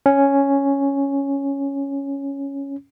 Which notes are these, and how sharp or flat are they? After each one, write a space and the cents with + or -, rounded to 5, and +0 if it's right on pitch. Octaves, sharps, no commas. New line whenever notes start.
C#4 +0